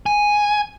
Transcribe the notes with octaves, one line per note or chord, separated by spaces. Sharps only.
G#5